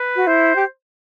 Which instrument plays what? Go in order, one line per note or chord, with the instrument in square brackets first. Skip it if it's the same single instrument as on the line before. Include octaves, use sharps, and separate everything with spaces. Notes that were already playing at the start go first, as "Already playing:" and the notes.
Already playing: [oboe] B4
[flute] F#4
[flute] E4 [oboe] C5
[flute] G4